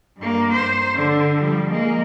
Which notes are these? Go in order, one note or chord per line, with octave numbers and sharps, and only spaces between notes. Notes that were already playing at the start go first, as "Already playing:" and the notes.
G2 A#3
C5
D3
F3 G3
G#3 A#3